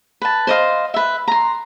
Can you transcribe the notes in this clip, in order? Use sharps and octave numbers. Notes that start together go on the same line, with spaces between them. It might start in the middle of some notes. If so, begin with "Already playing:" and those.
B4 A5
C5 D#5 F5
B4 E5
A#5 C6